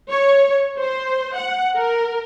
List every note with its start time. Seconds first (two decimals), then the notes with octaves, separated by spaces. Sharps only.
0.10 C#5
0.80 C5
1.36 F#5
1.76 A#4